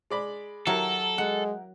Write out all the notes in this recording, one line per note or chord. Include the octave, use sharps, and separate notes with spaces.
G#3 D5 B5
F#3 E4 G4 A4 A#4
G#3 F#5